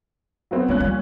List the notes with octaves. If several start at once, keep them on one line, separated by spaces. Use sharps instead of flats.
F#3 B3 C4
A#2 G3 C#4 F#6
F3 G3